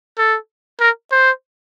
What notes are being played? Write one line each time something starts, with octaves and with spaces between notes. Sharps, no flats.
A4
A#4
C5